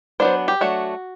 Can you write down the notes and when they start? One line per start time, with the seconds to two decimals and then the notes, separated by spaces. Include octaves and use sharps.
0.20 F#3 B3 D4 C5
0.48 G4
0.61 F#3 A3 D4 F#4